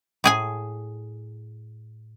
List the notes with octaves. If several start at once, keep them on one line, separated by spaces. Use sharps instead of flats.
A2 G#4 G#5